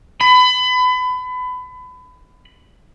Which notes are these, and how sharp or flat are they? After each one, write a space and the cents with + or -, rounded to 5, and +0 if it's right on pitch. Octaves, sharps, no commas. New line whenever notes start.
B5 +30